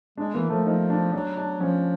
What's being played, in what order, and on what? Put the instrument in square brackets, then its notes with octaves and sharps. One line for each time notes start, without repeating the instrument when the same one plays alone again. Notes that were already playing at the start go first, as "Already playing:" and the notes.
[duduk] G#3 [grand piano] D4
[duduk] E3 [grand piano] A#3
[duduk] F3 [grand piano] A3
[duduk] F3 [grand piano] D#4
[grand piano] D4
[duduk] F#3 [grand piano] D4
[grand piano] D4
[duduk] F3 [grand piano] C#4